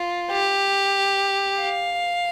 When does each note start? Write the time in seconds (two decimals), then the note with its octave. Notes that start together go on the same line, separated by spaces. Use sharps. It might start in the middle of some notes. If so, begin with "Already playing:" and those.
Already playing: F4
0.31 G4
1.60 F5